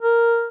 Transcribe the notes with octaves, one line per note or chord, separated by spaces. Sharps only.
A#4